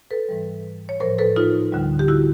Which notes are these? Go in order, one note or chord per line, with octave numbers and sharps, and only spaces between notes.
A4 B4
G#2 E3 G3
C#5
A2 F3 A#4 C5
A4 B4
D#4 F4
D2 D3 G3
G4
E4 F#4